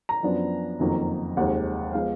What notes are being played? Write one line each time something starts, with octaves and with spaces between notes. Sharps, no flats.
A#5
F#2 F3 B3 D4
F#1 F2 D#3 F#3 A#3
F1 D#2 D#3 G#3 F#5
F3 G#3 B3 F5